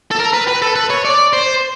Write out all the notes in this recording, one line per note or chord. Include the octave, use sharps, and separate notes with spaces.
A4
A#4
B4
B4
A4
B4
C#5
D5
C5